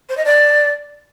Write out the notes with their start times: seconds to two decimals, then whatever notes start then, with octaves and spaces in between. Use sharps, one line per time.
0.09 C5
0.17 D#5
0.25 D5